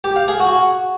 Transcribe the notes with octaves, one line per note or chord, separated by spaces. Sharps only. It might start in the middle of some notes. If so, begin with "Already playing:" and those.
G4
F5
G#4
F#4